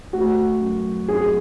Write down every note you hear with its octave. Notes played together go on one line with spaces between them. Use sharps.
A3 F#4
F#2
F#2 G#4